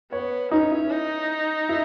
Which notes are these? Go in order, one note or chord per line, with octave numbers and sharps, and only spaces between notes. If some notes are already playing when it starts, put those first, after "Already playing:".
B3 C#5
C#4 D#4
E4
D#4
E4